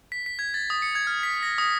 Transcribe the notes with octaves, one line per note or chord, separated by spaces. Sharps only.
B6
B6
G#6
A6
D#6
C#7
G#6
F6
B6
A#6
D#6